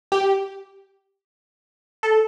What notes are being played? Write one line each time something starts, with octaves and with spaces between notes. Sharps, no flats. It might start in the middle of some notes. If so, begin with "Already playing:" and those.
G4
A4